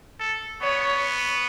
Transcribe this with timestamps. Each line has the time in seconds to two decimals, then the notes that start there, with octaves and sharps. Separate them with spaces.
0.20 A4
0.62 B3 C#5